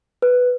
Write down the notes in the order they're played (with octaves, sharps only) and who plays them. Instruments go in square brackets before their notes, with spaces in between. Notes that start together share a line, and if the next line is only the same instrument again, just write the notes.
[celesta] B4